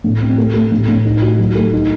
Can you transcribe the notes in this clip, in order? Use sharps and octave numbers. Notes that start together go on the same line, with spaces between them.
A2
C4
A3
A3
A2
A2
D#4
F#4
F#3
A3
D#4